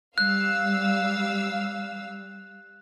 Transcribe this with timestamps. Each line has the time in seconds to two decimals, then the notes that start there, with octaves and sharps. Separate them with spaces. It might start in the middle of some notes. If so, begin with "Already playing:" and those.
0.18 G3 F5 E6 F#6